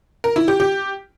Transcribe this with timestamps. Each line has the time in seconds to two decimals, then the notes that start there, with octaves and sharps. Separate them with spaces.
0.24 A#4
0.36 E4
0.48 G4
0.60 G4